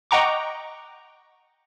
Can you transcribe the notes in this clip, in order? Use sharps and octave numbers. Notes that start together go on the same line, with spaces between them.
D#5 F#5 G5 A#5 C#6 D6